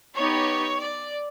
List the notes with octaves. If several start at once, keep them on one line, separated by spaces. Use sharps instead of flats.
B3 D#4 G4 C#5
D5